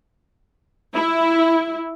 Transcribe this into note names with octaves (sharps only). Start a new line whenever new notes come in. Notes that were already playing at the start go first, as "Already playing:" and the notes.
E4